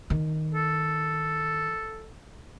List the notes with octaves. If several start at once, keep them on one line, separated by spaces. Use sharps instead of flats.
D#3
A4